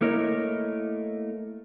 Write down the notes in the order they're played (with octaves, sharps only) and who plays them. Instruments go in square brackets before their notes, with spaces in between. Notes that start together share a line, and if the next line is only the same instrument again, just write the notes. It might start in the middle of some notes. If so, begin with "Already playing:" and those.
[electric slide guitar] A3 A#3 E4 A#4 C#5 D#5